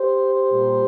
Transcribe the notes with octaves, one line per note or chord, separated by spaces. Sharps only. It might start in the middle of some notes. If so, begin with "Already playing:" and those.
Already playing: G4 C5
A#2 G3 A#3